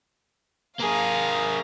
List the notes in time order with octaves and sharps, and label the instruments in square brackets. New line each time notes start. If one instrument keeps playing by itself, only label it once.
[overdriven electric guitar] A#3 G#4 [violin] F5 A#5